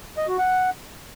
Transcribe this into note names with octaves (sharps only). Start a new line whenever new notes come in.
D#5
F#4
F#5